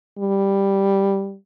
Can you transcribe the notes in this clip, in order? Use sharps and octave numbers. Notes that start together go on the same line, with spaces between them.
G3